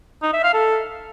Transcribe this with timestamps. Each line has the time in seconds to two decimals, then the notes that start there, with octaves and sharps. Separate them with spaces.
0.23 D#4
0.33 E5
0.43 F5
0.54 A4